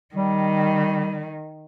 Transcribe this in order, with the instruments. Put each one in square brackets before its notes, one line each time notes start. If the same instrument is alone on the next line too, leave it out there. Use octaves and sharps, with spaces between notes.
[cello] D#3 [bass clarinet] G3